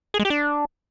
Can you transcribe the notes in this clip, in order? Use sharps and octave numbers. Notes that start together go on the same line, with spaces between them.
G#4
G#3
G4
D4